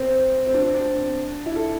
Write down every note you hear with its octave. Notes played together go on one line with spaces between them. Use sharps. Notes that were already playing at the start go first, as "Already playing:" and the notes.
Already playing: C4
C4
D4
C4
D4
E4
A4